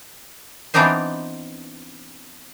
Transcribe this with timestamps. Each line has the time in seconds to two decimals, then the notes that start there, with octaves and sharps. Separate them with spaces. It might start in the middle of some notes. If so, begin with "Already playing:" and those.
0.74 E3 B3 C4 D4 D#4 C5